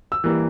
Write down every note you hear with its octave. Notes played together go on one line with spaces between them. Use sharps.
E6
E3 G3 A#3